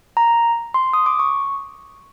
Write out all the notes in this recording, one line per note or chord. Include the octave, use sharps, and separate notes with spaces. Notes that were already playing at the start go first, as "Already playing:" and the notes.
A#5
C6
D#6
D6
C#6